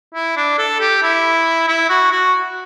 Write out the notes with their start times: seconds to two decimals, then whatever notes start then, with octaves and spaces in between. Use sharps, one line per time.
0.14 E4
0.37 D4
0.58 A4
0.80 G4
1.03 E4
1.68 E4
1.89 F#4
2.12 F#4